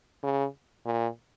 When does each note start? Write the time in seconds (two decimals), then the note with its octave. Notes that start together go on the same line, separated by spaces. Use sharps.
0.23 C#3
0.86 A#2